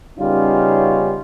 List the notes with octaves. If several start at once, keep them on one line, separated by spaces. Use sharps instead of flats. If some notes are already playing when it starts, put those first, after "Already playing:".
C#3 G3 B3 C#4 D#4 F4